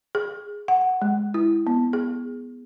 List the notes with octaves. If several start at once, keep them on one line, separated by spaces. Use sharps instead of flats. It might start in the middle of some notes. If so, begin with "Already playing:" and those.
G#4
F#5
G#3
E4
B3
G#4